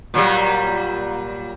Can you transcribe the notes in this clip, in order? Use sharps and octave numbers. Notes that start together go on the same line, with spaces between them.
A#2 F#3 G3